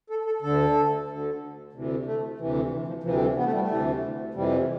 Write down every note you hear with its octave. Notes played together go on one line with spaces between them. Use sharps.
A4
A4
D2 D3 A4
D2 D3
D2 C3 E3
A3
D2 C3 E3
F3
E3
F3
D2 C3 E3 F3
G3
F3
B3
A3
G3
A3
D2 C3 E3
F2 C3 E3 G3